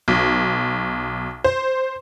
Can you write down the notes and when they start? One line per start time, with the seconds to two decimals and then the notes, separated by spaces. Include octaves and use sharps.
0.08 B1
1.44 C5